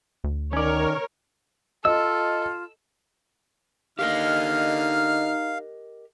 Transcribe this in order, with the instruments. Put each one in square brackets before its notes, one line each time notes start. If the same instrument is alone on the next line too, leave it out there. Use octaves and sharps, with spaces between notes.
[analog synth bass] D2
[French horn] D#3 [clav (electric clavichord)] C#4 D5 [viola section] A#4 C#5
[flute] F4 [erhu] A4 [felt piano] D#5 [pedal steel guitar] E6
[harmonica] D3 F6 [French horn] D#4 [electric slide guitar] G4 A#4 D#5 [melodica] F5